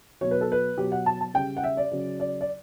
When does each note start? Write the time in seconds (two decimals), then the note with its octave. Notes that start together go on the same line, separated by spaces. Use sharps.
0.21 B2 F#3 C#5
0.31 B4
0.41 A4
0.52 B4
0.78 B2 F#3 G4
0.92 F#5
1.06 A5
1.21 A5
1.34 C#3 G3 G5
1.57 F#5
1.64 E5
1.77 D5
1.91 C#3 F#3
2.20 D5
2.41 D5